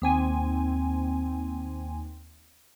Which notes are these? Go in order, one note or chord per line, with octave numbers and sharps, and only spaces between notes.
D#2 C4 G#5